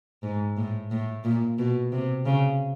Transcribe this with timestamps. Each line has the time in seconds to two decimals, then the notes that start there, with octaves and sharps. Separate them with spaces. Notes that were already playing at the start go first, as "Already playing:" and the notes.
0.23 G#2
0.57 A2
0.91 A2
1.24 A#2
1.58 B2
1.92 C3
2.26 C#3